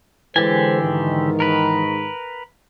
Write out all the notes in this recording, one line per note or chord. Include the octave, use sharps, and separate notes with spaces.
D3 E3 G#3 G4 A4 C5 G#5 A6
G#2 D#3
A#4 B4